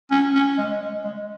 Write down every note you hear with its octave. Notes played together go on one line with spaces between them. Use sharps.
C#4
C#4
G#3
G#3
G#3